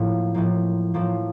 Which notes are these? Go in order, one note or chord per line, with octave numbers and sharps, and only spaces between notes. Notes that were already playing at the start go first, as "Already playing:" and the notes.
Already playing: A2 F3 A#3
A2 F3 A#3
A2 F3 A#3